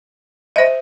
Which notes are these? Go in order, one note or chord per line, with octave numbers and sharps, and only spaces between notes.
C5 D#5 E5